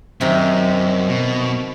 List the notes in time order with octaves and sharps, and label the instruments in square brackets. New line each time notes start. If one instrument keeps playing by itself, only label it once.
[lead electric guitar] F#2 [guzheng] C3 D#3 D#4
[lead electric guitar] B2